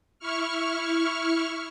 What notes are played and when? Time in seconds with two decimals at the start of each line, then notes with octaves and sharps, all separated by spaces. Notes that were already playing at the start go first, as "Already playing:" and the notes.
0.19 E4 C#6 F6